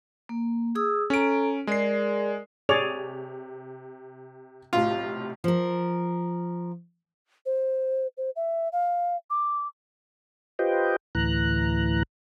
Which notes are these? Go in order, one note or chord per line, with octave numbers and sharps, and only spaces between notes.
A#3
G#4 D#6 E6
C#4 A4 A#5 D7
G#3 G#4 A#4 D5 C7
C3 G#4 C#5 D5 F7
B1 A2 C3 F4
F3 A#4
C5
C5
E5
F5
D6
F4 G4 B4 C5 D#5 G5
D2 A2 E3 A#5 F#6